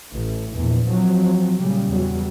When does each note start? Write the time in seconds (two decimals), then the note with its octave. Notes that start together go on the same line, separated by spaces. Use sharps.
0.12 A1 A2
0.57 A#1 E2
0.87 F3 F#3 C4
1.58 A#2 C#3 G3
1.89 E2 F#3 G3